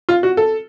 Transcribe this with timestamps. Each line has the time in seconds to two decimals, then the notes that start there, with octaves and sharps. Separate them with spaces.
0.09 F4
0.23 F#4
0.37 A4